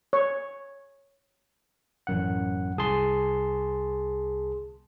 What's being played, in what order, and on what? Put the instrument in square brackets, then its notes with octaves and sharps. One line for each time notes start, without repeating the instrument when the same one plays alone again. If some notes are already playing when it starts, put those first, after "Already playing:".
[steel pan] C#5
[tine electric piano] A1 F#2 F#5
C2 G#4 A5 C6